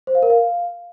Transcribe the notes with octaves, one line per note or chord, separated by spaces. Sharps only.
C5
F5
A#4
F5